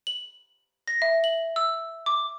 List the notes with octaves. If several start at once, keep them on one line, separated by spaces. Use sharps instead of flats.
F#7
A#6
E5
F#7
E6
D6